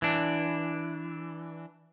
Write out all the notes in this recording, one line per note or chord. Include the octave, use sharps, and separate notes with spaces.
E3 D4